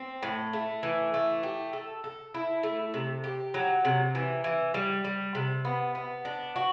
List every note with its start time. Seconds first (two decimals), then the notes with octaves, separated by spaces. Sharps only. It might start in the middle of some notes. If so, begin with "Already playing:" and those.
Already playing: C4
0.23 A2
0.53 A3
0.83 E3
1.14 A3
1.43 G4
1.73 A4
2.04 A4
2.34 E4
2.63 A3
2.94 C3
3.24 G4
3.54 F#3
3.85 C3
4.15 E3
4.44 E3
4.74 G3
5.04 G3
5.35 C3
5.65 B3
5.95 B3
6.25 D4
6.56 F#4